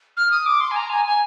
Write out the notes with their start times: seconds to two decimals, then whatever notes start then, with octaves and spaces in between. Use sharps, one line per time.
0.17 F6
0.31 D#6
0.46 D6
0.61 C6
0.71 G#5
0.76 A#5
0.90 G#5
1.05 G#5